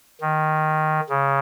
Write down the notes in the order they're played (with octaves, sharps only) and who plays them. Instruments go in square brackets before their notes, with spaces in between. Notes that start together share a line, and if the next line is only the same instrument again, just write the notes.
[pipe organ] D#3
C#3